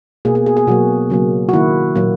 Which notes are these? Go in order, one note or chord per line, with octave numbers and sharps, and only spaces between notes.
B2 A#3 G#4
G#4
G#4
G#4
B2 F#3 A#3 F#4
C#3 F#3 A#3
F#4
D#3 A#3 E4
A#2 F#3 A#3